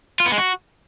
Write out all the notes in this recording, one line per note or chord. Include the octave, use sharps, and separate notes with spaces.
F4
B3
G#3
F#4